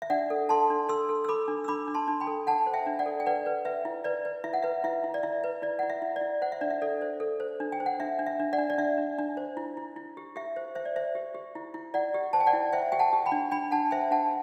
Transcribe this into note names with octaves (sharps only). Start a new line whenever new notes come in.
E5
D4 D5 F#5
A4
A4 A5 C6
D4
A4 C6 E6
A4
E6
A4 B5 D6
D4
E6
D4 B5 D6
D4
A5 C6
D4
G5 B5
A4
D4 F#5 A5
C5
E5 G5
D4
D5 F#5
A4
G5
B4 D5 F#5
B4
B4 E5
E4
B4 D5
B4
E4 E5
F#5
B4 E5
E4 E5
E4
D5
E4 E5
B4
E4 D5
E4 F#5
E5
E4
D5
E4
C5 F#5
E5
D4 D5
E5
A4 D5
C5
A4
C5
D4
G5
C5
F#5
D4 E5
D4
E5
D4
D5 F#5
D4
D5
D4 E5
D4
D4
C5
E4
E4
E4
G4
G4 E5
C5
C5 E5
D5
C5 E5
G4
G4
E4
E4
E4 D5 F#5
G4
C5 A5
G5
D5 F#5
E4
C5 E5 G5
G4 G5
F#5 A5
G4
G5 B5
D4
D4 G5 B5
D4 F#5 A5
C5 E5 G5
D4 F#5 A5